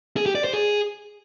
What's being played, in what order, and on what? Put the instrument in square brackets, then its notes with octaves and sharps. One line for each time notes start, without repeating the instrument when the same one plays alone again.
[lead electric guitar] G#4
G4
D5
C5
G#4